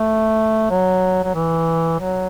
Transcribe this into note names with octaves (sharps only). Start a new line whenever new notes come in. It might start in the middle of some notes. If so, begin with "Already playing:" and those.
Already playing: A3
F#3
F#3
E3
F#3